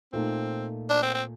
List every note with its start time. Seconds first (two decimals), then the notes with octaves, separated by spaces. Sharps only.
0.13 A#2 A3 C4 D#4
0.90 D4
1.02 C4
1.14 C4